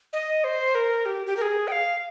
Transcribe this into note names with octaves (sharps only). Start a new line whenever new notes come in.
D#5
C5
A#4
G4
G4
A#4
G#4
G5
F5